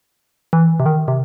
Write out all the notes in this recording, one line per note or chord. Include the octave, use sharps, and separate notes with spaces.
E3
C3
D#3
C3